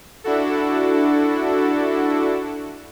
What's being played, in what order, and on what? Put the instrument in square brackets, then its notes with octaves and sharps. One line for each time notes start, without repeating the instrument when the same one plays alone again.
[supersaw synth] D4 E4 F#4 A4